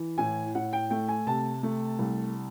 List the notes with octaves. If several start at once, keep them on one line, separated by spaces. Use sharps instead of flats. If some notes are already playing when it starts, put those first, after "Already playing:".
Already playing: E3
A2 G#5
A2 F#5
G5
A3 G5
G#5
C3 A5
A3
C2